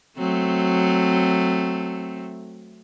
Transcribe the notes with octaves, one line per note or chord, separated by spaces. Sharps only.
F#3 A3 C4